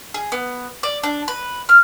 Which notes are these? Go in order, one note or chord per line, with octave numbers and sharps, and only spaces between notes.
G#4
B3
D5
D4
B4
F6